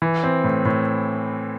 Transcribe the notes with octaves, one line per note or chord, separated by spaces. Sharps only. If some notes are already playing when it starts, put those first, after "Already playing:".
E3
C4
A2
A2